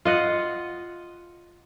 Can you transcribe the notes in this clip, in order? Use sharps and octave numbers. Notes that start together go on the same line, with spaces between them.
F4 D#5 F#5